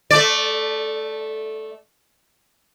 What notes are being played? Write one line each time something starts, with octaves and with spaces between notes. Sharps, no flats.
A3 D5